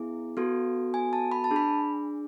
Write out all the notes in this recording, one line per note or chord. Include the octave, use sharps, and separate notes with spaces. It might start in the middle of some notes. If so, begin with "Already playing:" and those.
Already playing: B3 E4 G#4
B3 F#4 A4
G#5
A5
B5
A5
D4 G#4
B5